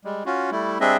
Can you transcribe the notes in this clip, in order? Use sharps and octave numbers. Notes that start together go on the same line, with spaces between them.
G3 G#3
C#4 F4 F#4
G3 A3 E4
G3 C4 D4 G#4 D#5 E5